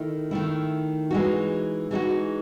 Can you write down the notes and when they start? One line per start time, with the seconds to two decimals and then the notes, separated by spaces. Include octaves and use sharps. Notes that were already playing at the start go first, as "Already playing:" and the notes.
Already playing: D#3 A3 E4
0.31 D#3 A3 E4
1.10 E3 G#3 D#4 F#4
1.91 E3 G#3 D#4 F#4